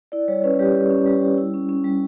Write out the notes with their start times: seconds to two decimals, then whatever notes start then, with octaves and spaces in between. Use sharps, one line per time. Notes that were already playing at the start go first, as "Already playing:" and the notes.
0.12 E4 D5
0.28 G3 C#5
0.44 C#4 B4
0.59 G3 G4
0.75 G3
0.90 C#4
1.06 G3
1.22 G3
1.38 E4
1.54 C#4
1.69 C#4
1.84 G3